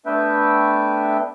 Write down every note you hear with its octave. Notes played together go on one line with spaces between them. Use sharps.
A3 B3 D4 B4 E5 G5